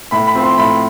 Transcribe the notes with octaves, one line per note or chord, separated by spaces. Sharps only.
A2 B5
B5
F3 C4
C6
A2 B5